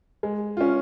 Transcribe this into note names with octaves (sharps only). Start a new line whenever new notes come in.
G#3
C#4 F4